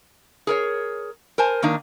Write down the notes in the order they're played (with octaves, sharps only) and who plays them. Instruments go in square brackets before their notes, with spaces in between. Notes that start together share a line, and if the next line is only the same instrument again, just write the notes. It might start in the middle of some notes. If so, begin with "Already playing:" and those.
[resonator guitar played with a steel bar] G#4 A#4 C#5
A#4 C5 G#5 A5
D#3 A#3 D4 D#4